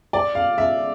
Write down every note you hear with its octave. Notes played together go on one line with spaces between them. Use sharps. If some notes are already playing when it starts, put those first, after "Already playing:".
D5
F5
E5